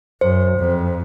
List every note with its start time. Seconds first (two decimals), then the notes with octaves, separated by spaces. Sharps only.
0.21 F#2 C5
0.58 F2